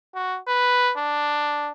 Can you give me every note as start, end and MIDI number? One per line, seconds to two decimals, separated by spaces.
0.15 0.38 66
0.47 0.92 71
0.97 1.71 62